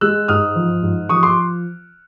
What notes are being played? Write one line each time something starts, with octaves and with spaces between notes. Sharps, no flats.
G#3 E6 F#6
G#2 D#6 F6
F3
G#2
F3 C#6 D#6
C6 D6